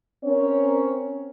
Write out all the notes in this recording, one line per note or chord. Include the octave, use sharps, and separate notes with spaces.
C4 C#4 A#4 C5 C#5